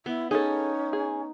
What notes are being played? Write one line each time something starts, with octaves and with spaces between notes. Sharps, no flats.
B3 E4
C#4 D#4 G#4 A4
G#4